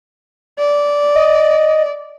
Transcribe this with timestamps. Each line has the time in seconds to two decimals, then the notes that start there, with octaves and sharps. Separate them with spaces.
0.59 D5
1.15 D#5